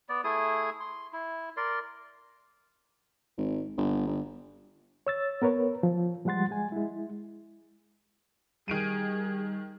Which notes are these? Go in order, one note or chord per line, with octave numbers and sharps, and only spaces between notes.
B3 D5
A3 E4 G#4 D#6
C6
E4
A#4 D5 C6
G#1
G1
G1
C#5 E6 A6
B3 A#4 B4 C#5
F3
F3 G3 G#3 F#5 C6 A6
G#3 G#5
G#3 E4
D#3 G3 G#4 D7 D#7